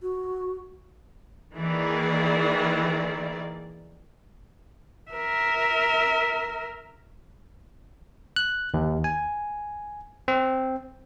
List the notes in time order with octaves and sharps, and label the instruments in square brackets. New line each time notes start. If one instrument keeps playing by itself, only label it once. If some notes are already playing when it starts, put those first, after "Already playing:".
[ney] F#4
[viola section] D#3 E3 A#3 G#4 D5
[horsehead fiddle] A#4 E5
[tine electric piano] F#6
D#2
G#5
C4